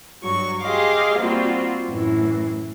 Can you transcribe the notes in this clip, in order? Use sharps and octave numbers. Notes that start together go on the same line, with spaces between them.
G2 F#3 C#6
G4 G#4 D#5 F5 C6 D6
G3 A#3 C4 F4 F#4
F#2 A2 E3